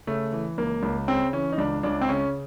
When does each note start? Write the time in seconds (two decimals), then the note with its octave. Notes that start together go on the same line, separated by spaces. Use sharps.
0.07 C#3 A3
0.33 E3
0.58 C#2 A#3
0.83 C#2
1.08 C#3 C4
1.33 E3 C#4
1.52 D#4
1.58 C#2 D4
1.83 C#2 D4
2.01 C4
2.09 C#3 C#4